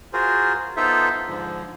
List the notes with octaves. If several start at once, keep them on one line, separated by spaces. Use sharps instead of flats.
F4 F#4 G#4 A#4 C5
B3 D#4 F4 A4 C5 E5
G#2 D3 F3